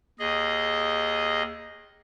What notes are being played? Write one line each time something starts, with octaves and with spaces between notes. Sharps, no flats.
D#2 G#4 D#5